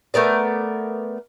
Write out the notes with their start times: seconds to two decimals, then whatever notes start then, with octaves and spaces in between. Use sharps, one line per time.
0.14 A3 B3 A#4 D5